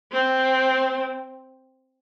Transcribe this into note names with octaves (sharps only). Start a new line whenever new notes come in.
C4